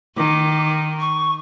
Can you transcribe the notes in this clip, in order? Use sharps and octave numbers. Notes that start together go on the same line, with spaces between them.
D#3 D6
C#6